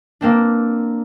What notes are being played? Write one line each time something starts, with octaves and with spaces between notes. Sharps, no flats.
A#3 C4 D4